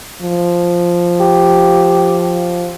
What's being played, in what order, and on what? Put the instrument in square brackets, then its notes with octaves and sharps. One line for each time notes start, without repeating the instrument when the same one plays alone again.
[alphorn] F3
[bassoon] G4